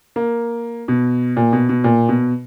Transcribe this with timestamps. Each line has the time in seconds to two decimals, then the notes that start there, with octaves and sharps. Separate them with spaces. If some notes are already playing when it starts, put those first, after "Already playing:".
0.16 A#3
0.88 B2
1.37 A#2
1.53 B2
1.69 B2
1.84 A#2
2.09 B2